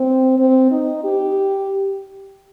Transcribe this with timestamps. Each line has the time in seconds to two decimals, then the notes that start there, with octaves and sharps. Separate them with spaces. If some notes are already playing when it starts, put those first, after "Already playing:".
Already playing: C4
0.38 C4
0.71 D#4
1.04 G4